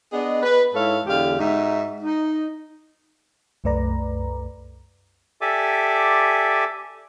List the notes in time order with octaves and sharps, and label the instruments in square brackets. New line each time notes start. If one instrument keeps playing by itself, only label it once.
[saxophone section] B3 D4 G#4 D#5
B4
G#2 E4 A4 C#5 F5
E2 D3 G#3 G4 F5
G#2 D#4 F#4 E5
D#4
[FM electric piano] C2 F#2 A3 B4 D5 A#5
[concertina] G4 A4 D5 E5 G#5 D6